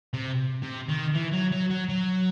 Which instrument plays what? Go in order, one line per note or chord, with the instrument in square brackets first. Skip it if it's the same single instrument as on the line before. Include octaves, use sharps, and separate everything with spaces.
[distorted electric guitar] C3
C3
D#3
E3
F#3
F#3
F#3
F#3